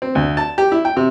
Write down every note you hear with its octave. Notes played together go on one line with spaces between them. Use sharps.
C4
D2
A5
G4
E4
G5
C3